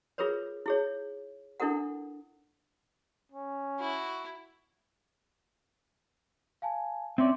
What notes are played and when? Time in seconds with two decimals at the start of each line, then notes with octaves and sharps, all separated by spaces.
0.18 F4 G#4 A#4 B4 C#5
0.66 E4 G#4 C#5
1.60 D4 E4 A4 A#4 F#5
3.32 C#4
3.80 E4 F#4
6.62 F5 G#5 A5
7.18 C4 C#4 D5 E5 C6 D6